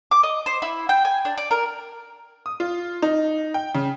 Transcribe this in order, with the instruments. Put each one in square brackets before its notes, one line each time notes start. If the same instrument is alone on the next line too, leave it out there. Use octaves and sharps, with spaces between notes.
[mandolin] D6
D#5
C5
E4
G5
G#5
D4
D5
A#4
[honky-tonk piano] D#6
F4
D#4
G5
C#3